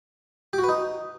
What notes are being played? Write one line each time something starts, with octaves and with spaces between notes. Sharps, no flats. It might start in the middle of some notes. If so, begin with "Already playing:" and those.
G4
F#4
B4
D#4